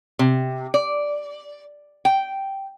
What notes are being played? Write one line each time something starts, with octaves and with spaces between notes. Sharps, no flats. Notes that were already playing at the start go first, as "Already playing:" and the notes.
C3
D5
G5